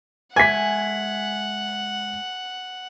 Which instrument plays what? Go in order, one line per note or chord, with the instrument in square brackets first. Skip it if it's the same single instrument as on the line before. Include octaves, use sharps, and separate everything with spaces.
[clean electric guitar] G#3 E5 [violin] F#5 [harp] G#5 [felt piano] G#6 B6